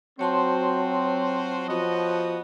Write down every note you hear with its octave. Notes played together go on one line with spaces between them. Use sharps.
F#3 C4 F4 F#4 C5 C#5 A5 C6
F3 B3 F#4 D#5